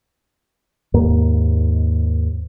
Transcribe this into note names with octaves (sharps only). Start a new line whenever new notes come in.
D#2 G#2 A#3